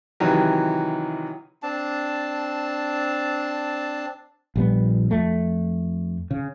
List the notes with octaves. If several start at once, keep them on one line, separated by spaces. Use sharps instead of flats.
C3 D#3 E3 F#3
C4 D4 A5
A#1 G3 B3
F2 A3
C#3